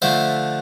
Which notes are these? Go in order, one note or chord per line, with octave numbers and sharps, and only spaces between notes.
D3 F3 A3 C5 E5